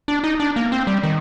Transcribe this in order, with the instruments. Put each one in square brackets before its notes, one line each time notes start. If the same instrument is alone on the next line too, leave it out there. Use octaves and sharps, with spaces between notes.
[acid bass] D4
D#4
D4
A#3
C4
G3
D#3